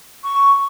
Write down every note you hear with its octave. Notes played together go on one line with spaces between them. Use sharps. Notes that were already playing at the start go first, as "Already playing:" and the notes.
C#6